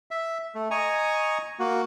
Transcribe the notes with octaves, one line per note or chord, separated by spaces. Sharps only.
E5
A3
D#5 G#5 A#5 C#6
A#3 F#4